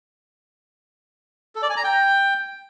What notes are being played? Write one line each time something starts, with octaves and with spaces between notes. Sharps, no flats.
A4
D5
G#5
A#5
G5